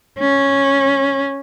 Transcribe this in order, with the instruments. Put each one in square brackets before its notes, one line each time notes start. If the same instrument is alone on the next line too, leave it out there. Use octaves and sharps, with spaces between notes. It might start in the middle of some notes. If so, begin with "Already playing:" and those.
[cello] C#4